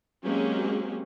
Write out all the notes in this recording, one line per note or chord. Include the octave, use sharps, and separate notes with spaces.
F#3 G#3 A#3 C4 C#4 G4